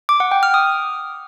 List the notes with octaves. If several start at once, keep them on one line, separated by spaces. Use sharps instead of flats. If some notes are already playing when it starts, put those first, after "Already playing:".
D6
F#5
G5
F6
D#6